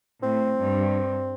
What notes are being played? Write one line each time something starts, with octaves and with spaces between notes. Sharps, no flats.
A2 C4
G2